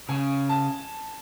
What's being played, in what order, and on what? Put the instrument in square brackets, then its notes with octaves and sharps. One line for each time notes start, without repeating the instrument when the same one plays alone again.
[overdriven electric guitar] C#3 [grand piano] G#5
[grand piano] A5